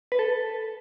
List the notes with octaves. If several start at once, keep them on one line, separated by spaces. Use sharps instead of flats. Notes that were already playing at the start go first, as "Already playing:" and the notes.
B4
A4